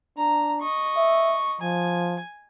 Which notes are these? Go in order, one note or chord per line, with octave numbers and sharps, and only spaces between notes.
D4 A#5
D#5 C#6
E5
F3 G#5